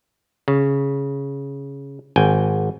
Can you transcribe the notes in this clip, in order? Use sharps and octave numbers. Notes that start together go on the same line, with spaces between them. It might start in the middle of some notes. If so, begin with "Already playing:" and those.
C#3
G#1 G5 G#5